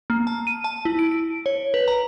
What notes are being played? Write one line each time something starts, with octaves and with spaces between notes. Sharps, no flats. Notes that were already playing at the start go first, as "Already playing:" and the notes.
A#3
A5
D#7
A5
E4
D7
D7
C#5
B4
A#5